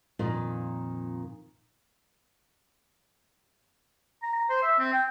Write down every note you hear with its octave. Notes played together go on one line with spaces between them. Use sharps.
F2 A#2 D#3
A#5
A#5
C5
E5
C4
G5